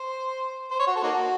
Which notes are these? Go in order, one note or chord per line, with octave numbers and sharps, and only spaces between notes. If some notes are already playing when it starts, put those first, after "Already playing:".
Already playing: C5
C5
C#5
F#4
A4
A#3 D#4 F#4